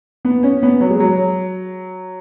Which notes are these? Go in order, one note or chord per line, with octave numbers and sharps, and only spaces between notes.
B3
C#4
B3
F#3
G#3
F#3